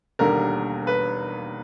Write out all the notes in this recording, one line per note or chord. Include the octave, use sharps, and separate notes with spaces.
E1 D#2 D3 G3 A#3 A#4
B4